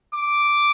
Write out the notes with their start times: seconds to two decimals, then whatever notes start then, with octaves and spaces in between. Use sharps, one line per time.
0.15 D6